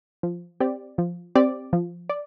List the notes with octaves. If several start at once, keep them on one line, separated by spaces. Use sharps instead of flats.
F3
C4 G4 D5
F3
C4 G4 D5
F3
D5